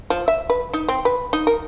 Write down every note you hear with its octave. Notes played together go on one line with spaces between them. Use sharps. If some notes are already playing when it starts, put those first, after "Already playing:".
F3
E5
B4
D#4
C4
B4
D#4
A#4